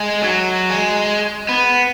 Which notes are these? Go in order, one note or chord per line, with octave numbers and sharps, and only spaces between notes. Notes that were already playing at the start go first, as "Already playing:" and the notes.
Already playing: G#3
F#3
G#3
B3